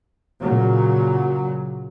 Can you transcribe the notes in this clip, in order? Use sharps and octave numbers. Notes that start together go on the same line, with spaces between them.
A#2 C#3 F#3